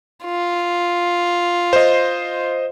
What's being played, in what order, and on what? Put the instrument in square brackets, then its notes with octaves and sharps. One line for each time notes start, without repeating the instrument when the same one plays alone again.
[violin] F4
[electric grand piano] C5 D#5